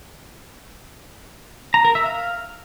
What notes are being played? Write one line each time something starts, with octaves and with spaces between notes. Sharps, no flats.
A#5
A#4
E5
F5